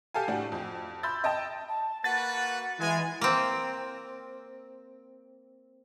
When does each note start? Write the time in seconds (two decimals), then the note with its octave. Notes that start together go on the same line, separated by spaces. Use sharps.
0.14 G4 A4 F5 G#5
0.28 A2 D4 F#4
0.52 F2
1.03 B5 C6 E6 G6 A6
1.24 D#5 G5 A5 A6
1.69 A5
2.04 A#3 F#4 B4 F#5 A6
2.80 E3 G#3 G#5
3.21 A#3 C4